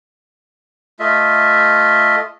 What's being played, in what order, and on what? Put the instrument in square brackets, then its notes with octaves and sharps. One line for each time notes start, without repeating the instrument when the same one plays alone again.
[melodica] A3 F4 D#5 E5